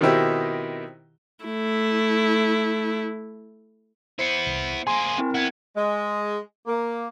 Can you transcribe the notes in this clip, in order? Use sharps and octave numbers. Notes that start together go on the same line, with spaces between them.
B2 D#3 C4 D#4 E4 G4
A3 E4
B3 E4 C5 C7 C#7
C2
A#3 G#4 G#5 C6
C4 E4 A#4
B3 E4 F#5 G#6
G#3
A#3